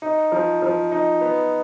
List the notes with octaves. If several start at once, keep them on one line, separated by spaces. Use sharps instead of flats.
D#4
F3
F3
D#4
B3